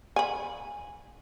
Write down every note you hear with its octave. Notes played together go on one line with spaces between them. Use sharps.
G#5 B5